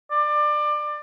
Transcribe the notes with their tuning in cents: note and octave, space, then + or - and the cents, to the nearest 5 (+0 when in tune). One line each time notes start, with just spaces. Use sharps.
D5 +25